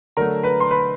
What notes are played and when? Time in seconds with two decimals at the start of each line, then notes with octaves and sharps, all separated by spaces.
0.17 D3 F#3 A3 A#4 A#5
0.43 B4 B5
0.60 C6
0.71 B4 B5